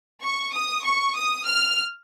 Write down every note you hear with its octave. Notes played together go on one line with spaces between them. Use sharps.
C#6
D#6
C#6
D#6
F6